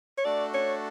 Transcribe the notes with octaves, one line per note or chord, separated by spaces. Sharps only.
C#5
A3 D4 F#4 A4 D5
C#5